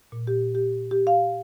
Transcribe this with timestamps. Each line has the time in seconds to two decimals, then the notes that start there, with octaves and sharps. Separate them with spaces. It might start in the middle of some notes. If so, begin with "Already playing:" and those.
0.12 A#2
0.27 G4
0.55 G4
0.91 G4
1.07 F5